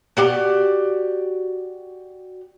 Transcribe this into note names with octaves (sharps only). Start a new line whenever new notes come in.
F#4 G4 D5